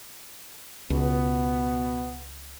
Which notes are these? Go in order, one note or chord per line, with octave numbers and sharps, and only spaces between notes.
C#2 B2 B3